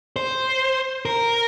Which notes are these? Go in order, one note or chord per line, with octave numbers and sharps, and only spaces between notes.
C5
A#4